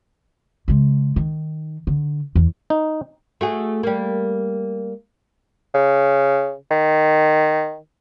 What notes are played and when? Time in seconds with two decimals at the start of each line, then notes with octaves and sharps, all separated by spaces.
0.68 C#3 G#3
1.16 D#3
1.87 D3
2.35 E2
2.70 D#4
3.41 A3 F#4 G#4
3.83 G3 A#3
5.74 C#3
6.71 D#3